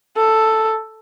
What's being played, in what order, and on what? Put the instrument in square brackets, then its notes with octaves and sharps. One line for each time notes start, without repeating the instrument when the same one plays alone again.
[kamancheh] A4